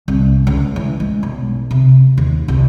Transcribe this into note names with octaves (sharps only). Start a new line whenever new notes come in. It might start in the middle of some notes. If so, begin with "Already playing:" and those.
C2
C#2
E3
G#3
B1
C3
D#2
C2